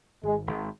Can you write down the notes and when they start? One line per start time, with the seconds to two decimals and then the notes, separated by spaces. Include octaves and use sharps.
0.23 G#1 G#3
0.47 G#1